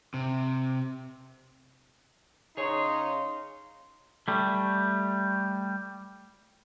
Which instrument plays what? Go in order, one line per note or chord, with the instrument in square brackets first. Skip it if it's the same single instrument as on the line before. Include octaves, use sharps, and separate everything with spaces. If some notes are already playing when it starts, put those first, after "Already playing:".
[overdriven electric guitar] C3
[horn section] C#3 F5 C6 [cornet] D#4 [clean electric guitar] G#4 C#5
[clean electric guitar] G3 A3